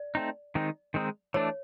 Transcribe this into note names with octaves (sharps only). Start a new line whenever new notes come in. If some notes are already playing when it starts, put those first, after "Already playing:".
Already playing: D5
A3 C4 D#4
D#3 G#3 C4 D#4
D#3 G#3 C4 D#4
E3 A3 D4 C#5